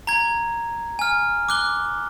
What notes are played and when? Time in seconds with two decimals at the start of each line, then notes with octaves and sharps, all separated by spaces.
0.07 A#5 G#6
0.99 G#5 F6
1.49 D6 F#6 G7